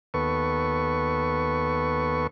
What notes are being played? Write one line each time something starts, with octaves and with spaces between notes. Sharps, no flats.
D#2 B3 A4 B4 C#6